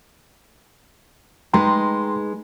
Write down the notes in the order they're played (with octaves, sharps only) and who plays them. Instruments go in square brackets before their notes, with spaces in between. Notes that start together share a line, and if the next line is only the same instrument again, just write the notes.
[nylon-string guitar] G#3 D#4 B4 [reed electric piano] G5 A#5 C6